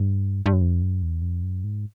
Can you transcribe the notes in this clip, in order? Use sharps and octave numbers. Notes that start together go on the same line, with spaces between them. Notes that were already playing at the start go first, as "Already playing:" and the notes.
Already playing: G2
G2
F#2
F2
F#2
E2
F2
F#2
G#2